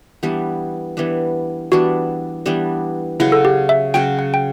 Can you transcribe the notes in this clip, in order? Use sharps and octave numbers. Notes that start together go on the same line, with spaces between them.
E3 G3 B3 D4
E3 G3 B3 D4
E3 G3 B3 D4 F#4
E3 G3 B3 D4
C#3 F#3 C#4 E4 F#4
A4
G4
E5
C#3 F#3 C#4 F#4 G5
F#5
G5